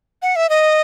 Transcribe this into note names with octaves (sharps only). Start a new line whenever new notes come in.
F#5
E5
D#5